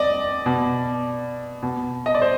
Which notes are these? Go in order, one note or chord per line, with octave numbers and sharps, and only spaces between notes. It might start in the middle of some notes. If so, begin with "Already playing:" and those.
Already playing: D5 D#5
B2
B2
D#5
D5
C5